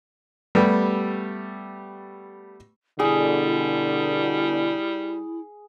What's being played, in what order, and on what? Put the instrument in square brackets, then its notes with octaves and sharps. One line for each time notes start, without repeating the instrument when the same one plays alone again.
[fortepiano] G3 A3 B3 G4
[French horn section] B2 D3 [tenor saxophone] G3 [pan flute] E4 [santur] G#4